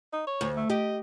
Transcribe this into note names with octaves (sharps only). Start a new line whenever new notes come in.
D#4
C#5
D2
A3
G4 D#5